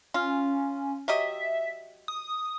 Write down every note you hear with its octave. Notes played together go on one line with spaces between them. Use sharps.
C#4 F4
F#3 G4 D#5 E5
D#6